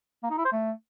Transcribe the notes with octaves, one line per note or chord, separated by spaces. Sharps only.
A#3
D#4
E4
C5
A3